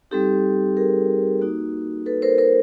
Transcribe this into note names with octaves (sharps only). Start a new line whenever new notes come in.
G3 C4 D#4 G4 A4
G#4 A#4
A#3 D#4 F#4
A4 B4
A#4 C5
A#4 C5